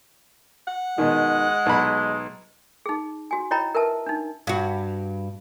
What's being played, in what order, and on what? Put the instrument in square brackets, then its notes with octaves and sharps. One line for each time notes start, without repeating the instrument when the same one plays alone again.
[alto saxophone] F#5
[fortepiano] B2 D#3 [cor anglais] G#3
[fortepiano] B1 B5
[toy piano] D#4 G#4
F#4 G#5
E4 C#5 D#5 G5 A#5 B5
A#4 B4 E5 A5
D4 D#4
[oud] G2 F#4